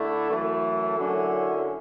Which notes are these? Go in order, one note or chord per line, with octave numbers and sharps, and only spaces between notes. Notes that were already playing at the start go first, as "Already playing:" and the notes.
Already playing: D3 A3 E4
F#2 E3 A3
F#2 D3 F#3 C#4 E4